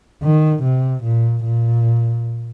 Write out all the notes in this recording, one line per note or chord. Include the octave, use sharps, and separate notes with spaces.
D#3
C3
A#2
A#2